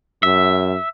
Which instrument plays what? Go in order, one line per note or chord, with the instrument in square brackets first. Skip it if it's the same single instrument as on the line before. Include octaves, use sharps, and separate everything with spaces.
[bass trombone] F#2 [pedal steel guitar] E5